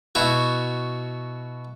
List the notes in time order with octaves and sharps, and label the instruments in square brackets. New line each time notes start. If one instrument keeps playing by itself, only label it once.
[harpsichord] B2 E4 F#4